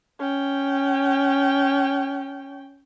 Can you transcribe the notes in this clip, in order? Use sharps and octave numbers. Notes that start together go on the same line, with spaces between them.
C#4 G5